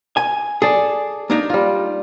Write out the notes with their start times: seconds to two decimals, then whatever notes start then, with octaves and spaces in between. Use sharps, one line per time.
0.17 G#5
0.62 G#4 A4 D5
1.30 A#3 D4 D#4
1.50 G3 F4